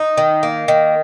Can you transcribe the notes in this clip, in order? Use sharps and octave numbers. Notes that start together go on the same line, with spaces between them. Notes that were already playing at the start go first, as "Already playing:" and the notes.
Already playing: D#4
D#3
A#3
D#3